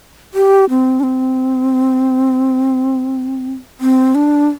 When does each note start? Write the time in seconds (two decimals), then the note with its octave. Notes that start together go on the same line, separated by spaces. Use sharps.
0.34 G4
0.70 C4
1.00 D4
1.03 C4
3.80 C4
4.15 D4